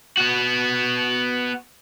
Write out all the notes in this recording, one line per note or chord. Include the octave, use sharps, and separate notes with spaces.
B3 F#4